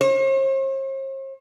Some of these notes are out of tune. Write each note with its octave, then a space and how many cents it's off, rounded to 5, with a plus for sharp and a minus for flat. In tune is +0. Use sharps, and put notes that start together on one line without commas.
C5 +45